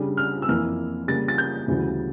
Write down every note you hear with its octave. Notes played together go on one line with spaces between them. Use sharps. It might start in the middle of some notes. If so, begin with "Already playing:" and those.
Already playing: C#3 G3 D4
F6
E6
F2 E3 A#3 F6
C#3 G3 A#3 A6
A6
G6
D2 C#3 E3 G3